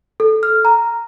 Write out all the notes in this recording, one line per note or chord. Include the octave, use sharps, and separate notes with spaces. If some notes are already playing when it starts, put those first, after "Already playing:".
A4
F6
A#5